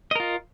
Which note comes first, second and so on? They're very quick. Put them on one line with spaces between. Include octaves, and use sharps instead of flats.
D#5 A#4 F4